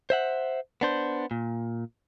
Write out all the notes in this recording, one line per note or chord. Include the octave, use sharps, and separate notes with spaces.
C5 E5 F#5
B3 D4 C5
A#2